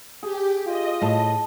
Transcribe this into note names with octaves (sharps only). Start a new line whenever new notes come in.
G4 G#4
F4 D#5
A2 A5